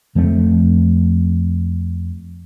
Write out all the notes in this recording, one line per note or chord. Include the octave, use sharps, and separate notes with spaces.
F2 F3 A3 C4